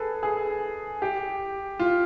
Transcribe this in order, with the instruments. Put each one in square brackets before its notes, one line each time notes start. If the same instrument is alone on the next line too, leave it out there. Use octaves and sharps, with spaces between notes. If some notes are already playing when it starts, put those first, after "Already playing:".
Already playing: [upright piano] G#4 A4 B4
G#4
G4
F4